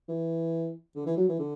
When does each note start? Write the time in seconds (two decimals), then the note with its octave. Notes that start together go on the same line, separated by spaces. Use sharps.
0.08 E3
0.95 D3
1.06 E3
1.17 F#3
1.28 E3
1.39 D3